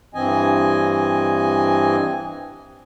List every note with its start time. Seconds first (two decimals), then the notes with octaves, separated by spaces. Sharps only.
0.14 G2 E3 C4 D#5 G#5